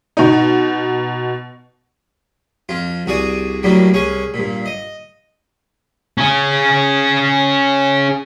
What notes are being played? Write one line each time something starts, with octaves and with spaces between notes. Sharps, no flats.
B2 D#4
F2 F4
C2 F#4 G#4 D5 D#6
F#2 A2 F#3 G3 A#3 D4
C2 C#4 G#4 C#6
G2 A#2
D#5
C#4 G#4